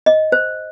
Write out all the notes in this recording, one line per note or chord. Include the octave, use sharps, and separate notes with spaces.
D#5
C5